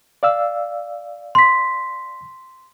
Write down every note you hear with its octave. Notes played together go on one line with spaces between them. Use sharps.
D5 F5 E6
C6 B6